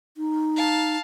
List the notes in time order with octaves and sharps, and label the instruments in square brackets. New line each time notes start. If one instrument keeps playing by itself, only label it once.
[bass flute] D#4
[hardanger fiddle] F5 A5